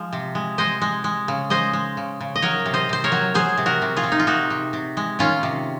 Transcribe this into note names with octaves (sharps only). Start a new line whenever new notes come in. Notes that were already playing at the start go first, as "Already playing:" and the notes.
Already playing: F3 G#3
C3
G#3
G#3 C5 D#5
G#3
G#3
C#3
G#3 C5 D#5
G#3
C#3
C#3
D#5
F#3 A#4 C#5
C3
C5 D#5
C3 C5
A#4 C#5
F#3
F#3 G#4 C5
C3
F#4 A#4
C3
F4 G#4
C3
D#4
F4
C3 D#4 F#4
C3
C3
G#3
D#3 C#4 F4
C3